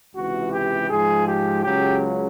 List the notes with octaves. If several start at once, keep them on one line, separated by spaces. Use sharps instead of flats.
C#2 C3 E3 F#4
G4
G#2 F3 G#3 G#4
G4
C#2 C#3 F#3 G4